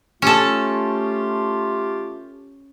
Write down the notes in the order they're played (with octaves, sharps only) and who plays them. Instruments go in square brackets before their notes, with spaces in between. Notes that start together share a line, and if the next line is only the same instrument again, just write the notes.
[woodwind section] A3 F4 G4 [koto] C#4 A4